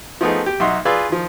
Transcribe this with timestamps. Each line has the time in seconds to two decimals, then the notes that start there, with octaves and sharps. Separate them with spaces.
0.21 F3 A3 B3 D#4 G#4
0.46 G4
0.60 B1 D#4 F#4 E5 C6
0.85 F4 G#4 B4 D5 G#5 E6
1.10 D#3 F3